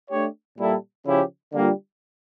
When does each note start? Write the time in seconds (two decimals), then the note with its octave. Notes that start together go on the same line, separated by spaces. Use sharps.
0.10 A3 D4 G4 C#5
0.58 A#2 G3 A#3 E4 A4
1.06 C#3 F3 C#4 E4 G4
1.53 D3 G3 A#3 D4 F4